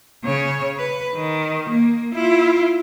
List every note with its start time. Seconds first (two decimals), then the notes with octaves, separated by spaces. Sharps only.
0.24 C#3 C#5
0.77 B4
1.16 D#3
1.70 A#3
2.15 E4 F4